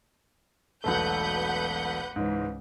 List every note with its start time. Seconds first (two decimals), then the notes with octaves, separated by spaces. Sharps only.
0.84 E1 B1 A3 B4 F#5 G6
2.16 C#2 G#2 E3